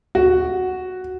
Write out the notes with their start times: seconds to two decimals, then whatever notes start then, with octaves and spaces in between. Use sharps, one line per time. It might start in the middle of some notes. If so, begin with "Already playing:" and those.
0.15 F#4